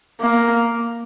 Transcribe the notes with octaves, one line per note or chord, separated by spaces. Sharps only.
A#3